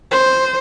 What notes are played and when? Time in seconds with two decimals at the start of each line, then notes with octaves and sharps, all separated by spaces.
0.11 C5